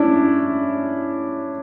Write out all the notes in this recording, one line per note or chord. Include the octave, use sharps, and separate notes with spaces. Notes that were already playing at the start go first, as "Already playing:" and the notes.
Already playing: C#4 D4 E4